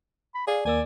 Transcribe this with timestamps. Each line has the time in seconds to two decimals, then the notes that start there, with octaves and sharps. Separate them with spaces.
0.35 B5
0.47 G#4 D5 F5
0.65 D#2 A#3 D5 G#5 E6